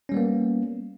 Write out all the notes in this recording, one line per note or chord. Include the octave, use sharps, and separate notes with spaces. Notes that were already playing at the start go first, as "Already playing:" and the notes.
G3 A#3 B3 C#4